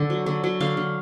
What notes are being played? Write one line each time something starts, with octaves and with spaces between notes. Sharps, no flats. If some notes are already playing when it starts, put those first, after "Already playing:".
Already playing: D3
F#3
D3
F#3
D3 F5
D3